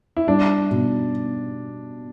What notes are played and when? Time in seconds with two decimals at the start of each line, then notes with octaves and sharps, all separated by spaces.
0.17 E4
0.27 G3 D4
0.71 B2